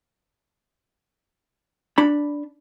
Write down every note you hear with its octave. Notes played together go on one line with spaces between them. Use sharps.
D4 B5